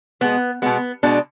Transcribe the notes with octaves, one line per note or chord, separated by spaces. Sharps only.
B2 G#3 B3
B2 G#3 B3
B2 G#3 D4